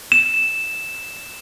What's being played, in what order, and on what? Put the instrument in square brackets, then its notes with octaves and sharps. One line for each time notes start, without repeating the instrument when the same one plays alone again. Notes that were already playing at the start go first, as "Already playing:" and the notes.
[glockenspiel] E7